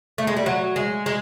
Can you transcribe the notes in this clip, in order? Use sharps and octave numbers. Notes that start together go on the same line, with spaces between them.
A3
G#3
G3
F#3
G#3
G#3